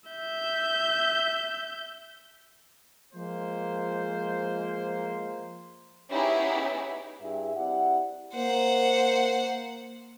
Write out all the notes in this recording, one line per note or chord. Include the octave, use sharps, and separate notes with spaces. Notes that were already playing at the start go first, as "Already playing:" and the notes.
E5 G6
F3 G#3 A#3 C5
B3 C#4 D#4 E4 G4 G#4
G2 E4 G#4 E5
C4 E4 G4 D5 F#5
A#3 C5 F#5